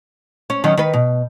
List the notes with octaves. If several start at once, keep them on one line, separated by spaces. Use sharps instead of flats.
C#4
D#3 F#3 C#4
D#3 B4
B2